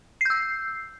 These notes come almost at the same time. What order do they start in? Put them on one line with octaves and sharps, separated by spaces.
C7 G6 E6